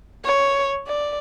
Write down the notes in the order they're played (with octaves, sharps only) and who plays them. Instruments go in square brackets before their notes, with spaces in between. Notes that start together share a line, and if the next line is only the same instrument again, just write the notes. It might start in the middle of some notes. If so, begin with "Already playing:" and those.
[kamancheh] C#5
D5